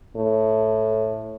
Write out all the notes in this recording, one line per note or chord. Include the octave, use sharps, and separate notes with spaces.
A2